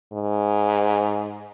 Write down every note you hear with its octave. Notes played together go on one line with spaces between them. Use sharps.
G#2